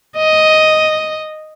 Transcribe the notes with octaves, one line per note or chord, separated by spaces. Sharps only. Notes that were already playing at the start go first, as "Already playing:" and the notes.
D#5